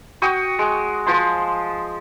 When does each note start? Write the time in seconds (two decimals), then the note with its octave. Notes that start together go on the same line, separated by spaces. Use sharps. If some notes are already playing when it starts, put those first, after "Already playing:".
0.22 F#4 G5 C#6 D#6
0.59 G#3
1.06 F3 C5 C6